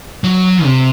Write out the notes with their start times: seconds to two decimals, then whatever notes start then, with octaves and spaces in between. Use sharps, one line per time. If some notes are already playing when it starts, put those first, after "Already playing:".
0.24 F#3
0.65 C3